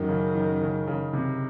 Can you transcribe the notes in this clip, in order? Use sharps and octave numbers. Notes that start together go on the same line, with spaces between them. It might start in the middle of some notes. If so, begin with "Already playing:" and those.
Already playing: F#2 D#3
C#3
D#3
C#3
C#3
C3